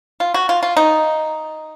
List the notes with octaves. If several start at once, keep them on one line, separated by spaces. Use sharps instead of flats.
F4
F#4
F4
F4
D#4